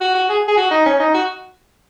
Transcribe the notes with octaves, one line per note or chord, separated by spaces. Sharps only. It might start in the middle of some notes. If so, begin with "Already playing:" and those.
F#4
F#4
G#4
G#4
F#4
D#4
C#4
D#4
F#4